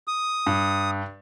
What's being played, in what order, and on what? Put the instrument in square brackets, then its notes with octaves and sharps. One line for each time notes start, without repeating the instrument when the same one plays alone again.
[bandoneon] D#6
[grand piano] G2